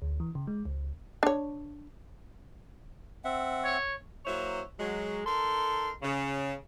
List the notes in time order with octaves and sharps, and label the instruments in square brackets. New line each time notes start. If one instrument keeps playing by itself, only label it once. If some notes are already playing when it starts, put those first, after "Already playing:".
[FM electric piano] D2
E3
C#3
G#3
C#2
[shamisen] D4 C#5
[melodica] C4 E5 F#5
[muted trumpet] C#5
[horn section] F#3 A#3 E4 C5 C#5
F#3 G#3
D#4 A4 A#4 C6
C#3